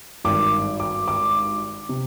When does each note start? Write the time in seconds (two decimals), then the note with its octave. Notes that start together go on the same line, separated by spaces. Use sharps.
0.24 G#1 G2 D#3 D6
0.80 D6
1.08 D6
1.89 C3